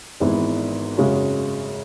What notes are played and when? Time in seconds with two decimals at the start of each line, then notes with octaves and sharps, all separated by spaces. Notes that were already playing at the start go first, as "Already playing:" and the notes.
0.20 G#1 G#2 E3 B3 E4
0.97 F#2 C#3 G#3 C#4 F#4